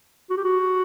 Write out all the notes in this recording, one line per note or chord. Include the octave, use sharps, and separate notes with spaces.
F#4
G4
F#4